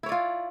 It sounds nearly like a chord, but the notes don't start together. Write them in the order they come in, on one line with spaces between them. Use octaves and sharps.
E4 C#5 D5 F4